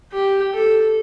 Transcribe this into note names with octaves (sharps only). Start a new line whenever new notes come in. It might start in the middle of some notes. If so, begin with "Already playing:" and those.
G4
A4